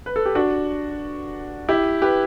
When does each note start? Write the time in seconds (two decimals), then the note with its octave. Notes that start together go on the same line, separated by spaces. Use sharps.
0.06 B4
0.16 A4
0.26 G4
0.35 D4 F#4
1.69 E4 G4
2.02 G4 B4